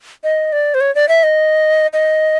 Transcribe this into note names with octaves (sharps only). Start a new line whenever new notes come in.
D#5
D5
C5
C#5
D5
E5
D#5
D#5